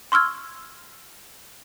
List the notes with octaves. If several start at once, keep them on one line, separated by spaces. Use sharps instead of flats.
C6 C#6 E6 F6 G#6